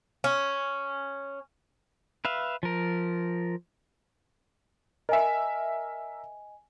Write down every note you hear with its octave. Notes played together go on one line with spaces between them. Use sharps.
C#4
B4 E5 F5
F3 A#4
A#4 D#5 E5 G#5